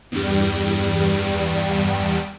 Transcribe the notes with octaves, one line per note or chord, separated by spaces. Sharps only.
E2 G2 G3